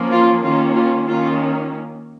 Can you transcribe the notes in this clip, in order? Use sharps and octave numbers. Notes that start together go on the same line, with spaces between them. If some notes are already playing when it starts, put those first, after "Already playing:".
Already playing: F3 A#3 C#4
F4
D#3 A#3 C#4 F4
F4
D#3 A#3 C#4 F4